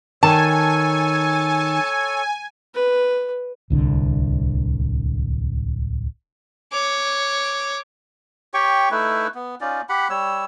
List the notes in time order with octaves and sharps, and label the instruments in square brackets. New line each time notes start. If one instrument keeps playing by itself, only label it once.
[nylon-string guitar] D#3 [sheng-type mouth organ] A4 C#5 [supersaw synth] G#5 [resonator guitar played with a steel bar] A5
[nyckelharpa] B4
[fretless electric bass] D1 C2 D3
[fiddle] C#5 D6
[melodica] G4 C#5 G5 C#6
A3 D#4 E4 B4
B3
C#4 D#4 F4 D5
G4 F#5 B5
G3 C#5 E6